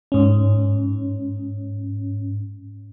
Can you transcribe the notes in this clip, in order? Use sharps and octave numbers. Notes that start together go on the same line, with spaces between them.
G#2 C#4